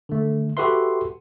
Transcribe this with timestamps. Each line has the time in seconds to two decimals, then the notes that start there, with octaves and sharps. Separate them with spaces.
0.09 D3 A3
0.57 F#4 G4 A4 B4 E5 C6